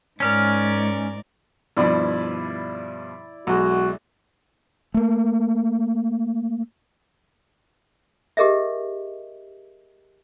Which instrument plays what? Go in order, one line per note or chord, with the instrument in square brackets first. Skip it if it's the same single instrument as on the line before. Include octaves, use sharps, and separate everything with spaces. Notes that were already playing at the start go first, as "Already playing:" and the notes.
[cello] G#2 [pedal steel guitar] C#4 F6 [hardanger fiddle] A#4 D5
[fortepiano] G2 B2 F3 [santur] E4 D5 B5
[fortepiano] B1 G#3 [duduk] F#4
[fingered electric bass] A3 A#3
[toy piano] G4 G#4 A#4 D#5 E5